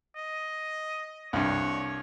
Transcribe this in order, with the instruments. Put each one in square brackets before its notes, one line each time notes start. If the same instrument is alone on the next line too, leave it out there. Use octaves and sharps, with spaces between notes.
[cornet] D#5
[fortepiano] C2 G2 [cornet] C#5